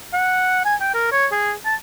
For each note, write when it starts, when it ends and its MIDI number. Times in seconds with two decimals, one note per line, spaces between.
0.13 0.64 78
0.65 0.75 80
0.80 0.92 79
0.94 1.11 70
1.12 1.26 73
1.32 1.53 68
1.65 1.75 81